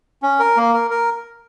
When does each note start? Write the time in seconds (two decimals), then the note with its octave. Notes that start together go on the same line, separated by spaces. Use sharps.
0.22 C#4
0.39 A#4
0.57 A#3
0.74 A#4
0.90 A#4